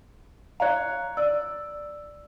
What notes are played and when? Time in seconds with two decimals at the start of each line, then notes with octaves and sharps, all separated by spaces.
0.60 C#5 F5 A#5 F#6
1.17 D5 E6